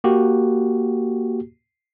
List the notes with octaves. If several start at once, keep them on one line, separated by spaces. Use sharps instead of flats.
A#3 F#4 G4